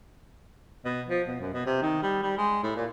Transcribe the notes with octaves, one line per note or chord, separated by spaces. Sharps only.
B2
F3
B2
F#2
B2
C3
D#3
G3
G3
G#3
A2
A#2